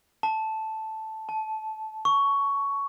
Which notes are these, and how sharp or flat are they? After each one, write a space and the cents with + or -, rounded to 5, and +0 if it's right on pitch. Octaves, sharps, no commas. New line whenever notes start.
A5 -5
A5 -15
C#6 +10